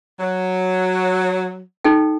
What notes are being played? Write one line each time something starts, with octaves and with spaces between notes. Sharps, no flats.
F#3
D#4 A4 G5